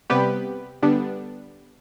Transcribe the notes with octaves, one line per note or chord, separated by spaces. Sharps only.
C3 G3 B3 G4 B4
D3 G3 B3 D4